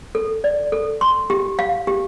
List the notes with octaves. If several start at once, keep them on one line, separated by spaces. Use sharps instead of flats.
A4
D5
A4
C6
G4
F5
G4